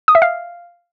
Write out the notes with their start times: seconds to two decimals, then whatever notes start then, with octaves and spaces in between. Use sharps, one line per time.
0.08 D#6
0.15 E5
0.22 F5